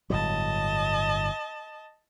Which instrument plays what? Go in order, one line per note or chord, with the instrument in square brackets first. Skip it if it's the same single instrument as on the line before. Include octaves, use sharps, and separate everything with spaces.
[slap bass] G1 A2 F#3 [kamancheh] D#5 A5